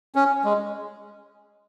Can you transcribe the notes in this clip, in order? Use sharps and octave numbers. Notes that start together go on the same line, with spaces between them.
C#4
G#3